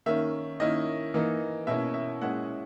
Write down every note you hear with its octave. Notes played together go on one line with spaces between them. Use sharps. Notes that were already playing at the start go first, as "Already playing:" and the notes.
D#3 A#3 C#4 E5
D#3 A#3 C#4 E4 D#5
E3 A#3 D#4
B2 A#3 C#4 E4 E5
E5
A#2 G#3 C#4 E4 F#5